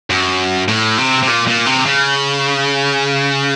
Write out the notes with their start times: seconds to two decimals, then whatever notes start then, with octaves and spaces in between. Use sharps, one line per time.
0.10 F#2
0.68 A2
0.98 C3
1.23 C3
1.27 A#2
1.47 A#2
1.66 C3
1.86 C#3